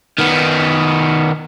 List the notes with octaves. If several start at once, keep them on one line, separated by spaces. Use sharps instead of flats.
D#3 B3